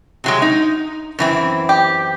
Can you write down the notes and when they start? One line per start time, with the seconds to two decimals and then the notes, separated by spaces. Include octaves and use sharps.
0.24 C3 F#3 G#3
0.42 D#4
1.19 F#2 E3 C4
1.69 G4